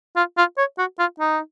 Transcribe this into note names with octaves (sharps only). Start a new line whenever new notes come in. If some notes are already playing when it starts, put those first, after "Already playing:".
F4
F4
C#5
F#4
F4
D#4